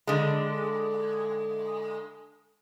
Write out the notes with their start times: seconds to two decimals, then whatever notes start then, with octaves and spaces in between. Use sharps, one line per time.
0.07 D3 G#3